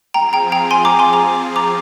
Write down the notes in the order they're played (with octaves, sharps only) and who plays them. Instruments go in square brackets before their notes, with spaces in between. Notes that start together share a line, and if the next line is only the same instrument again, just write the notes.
[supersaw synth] F3 C4 F4 G#4 [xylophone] G5 A#5
[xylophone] G5 A#5
G5 A#5
G#5 C6
A#5 D6
G#5 C6
A#5 D6
A#5 D6